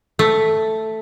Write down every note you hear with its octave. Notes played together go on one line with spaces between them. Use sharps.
A3